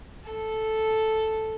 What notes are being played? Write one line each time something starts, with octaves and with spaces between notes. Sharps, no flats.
A4